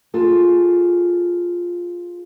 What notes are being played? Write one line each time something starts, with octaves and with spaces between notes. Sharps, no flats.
F4 G#4 A4